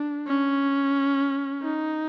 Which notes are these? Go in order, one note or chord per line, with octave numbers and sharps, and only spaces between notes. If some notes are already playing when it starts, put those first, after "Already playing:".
Already playing: D4
C#4
D#4